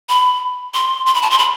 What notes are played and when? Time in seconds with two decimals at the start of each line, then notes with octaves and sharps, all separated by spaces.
0.09 B5
0.74 C6
1.06 C6
1.14 B5
1.22 A5
1.30 C6
1.39 B5